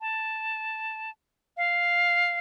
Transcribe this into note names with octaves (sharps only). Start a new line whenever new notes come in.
A5
F5